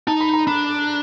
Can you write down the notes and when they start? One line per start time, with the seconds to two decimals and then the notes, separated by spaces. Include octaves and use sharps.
0.07 D#4 A5
0.21 B5
0.34 A#5
0.47 D4 B5